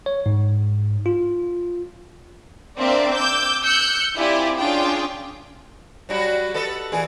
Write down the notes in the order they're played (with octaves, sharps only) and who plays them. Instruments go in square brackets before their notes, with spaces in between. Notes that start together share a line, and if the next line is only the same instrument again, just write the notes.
[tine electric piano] C#5
G#2
F4
[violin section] A#3 C4 D4 D5 E5 F5
D6 E6 G6
E6 F#6 G6 C#7
C4 E4 F4 G4 D5 G#5
C#4 D4 F4 G#4 G5
[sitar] F#3 G3 F#4
A4 B4 D#5
A#2 E3 G#4